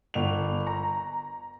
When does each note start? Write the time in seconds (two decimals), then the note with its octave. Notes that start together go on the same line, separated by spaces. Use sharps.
0.14 G1 F7
0.67 A#5